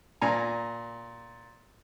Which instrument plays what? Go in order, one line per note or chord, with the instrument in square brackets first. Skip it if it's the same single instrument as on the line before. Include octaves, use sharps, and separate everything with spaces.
[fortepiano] A#2 G#5 A#5